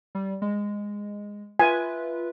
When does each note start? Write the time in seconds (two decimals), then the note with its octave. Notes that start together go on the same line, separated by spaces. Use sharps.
0.15 G3
0.42 G#3
1.59 F4 B4 E5 G#5